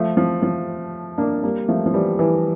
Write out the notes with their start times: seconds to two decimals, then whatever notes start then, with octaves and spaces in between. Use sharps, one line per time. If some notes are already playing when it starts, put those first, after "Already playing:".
Already playing: F3 A3
0.17 F3
0.43 F3
1.18 A#3 D4
1.43 G3 A#3
1.69 F3 A3
1.86 F3
1.93 E3 G3
2.19 E3